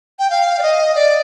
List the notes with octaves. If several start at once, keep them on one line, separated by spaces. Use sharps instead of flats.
G5
F5
D5
D#5
D5